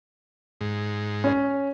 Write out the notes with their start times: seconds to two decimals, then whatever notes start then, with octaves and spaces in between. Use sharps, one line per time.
0.61 G#2
1.24 C#4 C#5